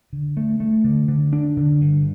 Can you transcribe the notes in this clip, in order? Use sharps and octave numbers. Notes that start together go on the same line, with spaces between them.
D3
A3
A3
D3
D3
D4
D3
G2